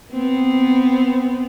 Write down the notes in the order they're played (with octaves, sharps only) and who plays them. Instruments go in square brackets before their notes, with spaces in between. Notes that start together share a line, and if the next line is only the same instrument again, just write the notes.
[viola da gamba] B3 C4